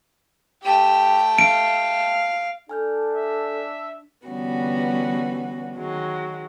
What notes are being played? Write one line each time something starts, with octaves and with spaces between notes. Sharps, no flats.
A3 G4 G5
F5 D7
D4 A4 G#5 F6 G6
E5
D3 E3 G3 B3 C#4 F#4
D#3 F#3 G#3